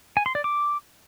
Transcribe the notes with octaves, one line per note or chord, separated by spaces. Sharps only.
G#5
C6
D5
D6